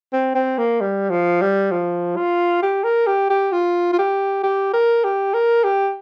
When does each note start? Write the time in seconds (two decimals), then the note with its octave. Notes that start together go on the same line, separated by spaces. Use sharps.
0.13 C4
0.35 C4
0.58 A#3
0.81 G3
1.10 F3
1.41 G3
1.71 F3
2.16 F4
2.62 G4
2.84 A#4
3.07 G4
3.30 G4
3.52 F4
3.92 F4
3.98 G4
4.43 G4
4.73 A#4
5.04 G4
5.34 A#4
5.64 G4